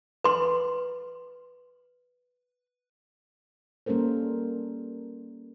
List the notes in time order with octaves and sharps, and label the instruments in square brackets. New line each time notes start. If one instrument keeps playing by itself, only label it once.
[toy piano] B4 C6
[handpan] G3 A#3 C#4 A4 A#4 C5